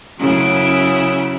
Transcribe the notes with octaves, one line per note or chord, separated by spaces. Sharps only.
F#2 C#3 E4